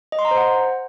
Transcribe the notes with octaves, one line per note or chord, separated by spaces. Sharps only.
D#5
C6
A#5
C5
F#5